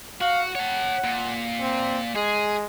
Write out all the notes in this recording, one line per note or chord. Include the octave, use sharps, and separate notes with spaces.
F#4 F5
C#5 F#5 A5
A#2
C4
G#3 G#4